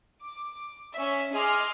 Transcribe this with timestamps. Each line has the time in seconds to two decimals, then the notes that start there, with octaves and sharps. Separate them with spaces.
0.22 D6
0.94 C#4 E5
1.33 G#4 D#5 G#5 C6 D6 F6